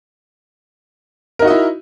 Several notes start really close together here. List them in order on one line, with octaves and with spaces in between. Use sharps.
A#4 D#4 F#4 D#5 E4